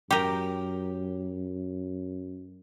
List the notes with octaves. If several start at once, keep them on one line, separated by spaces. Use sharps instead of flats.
F#2 G4 A#4